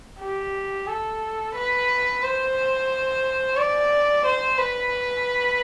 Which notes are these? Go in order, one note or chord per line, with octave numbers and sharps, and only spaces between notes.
G4
A4
B4
C5
D5
C5
B4